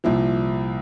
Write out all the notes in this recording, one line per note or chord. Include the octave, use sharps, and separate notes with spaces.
C2 A#2 F3 E4